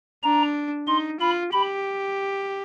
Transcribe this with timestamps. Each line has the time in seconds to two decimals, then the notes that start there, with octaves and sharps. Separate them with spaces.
0.23 D4 A#5
0.87 D#4 C6
1.20 F4 B5
1.52 G4 B5